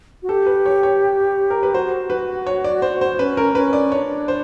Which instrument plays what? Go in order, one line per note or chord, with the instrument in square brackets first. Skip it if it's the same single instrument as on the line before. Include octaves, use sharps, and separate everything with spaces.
[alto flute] F#4
[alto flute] G4 [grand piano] A4
[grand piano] B4
C#5
C#5
A#4
B4
[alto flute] F#4 [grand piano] C5
[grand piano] B4
C#5
D5
C5
C5
[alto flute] C#4 [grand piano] B4
[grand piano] A#4
[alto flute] C#4 [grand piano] B4
[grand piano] D5
[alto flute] D4 [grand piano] C#5
[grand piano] C5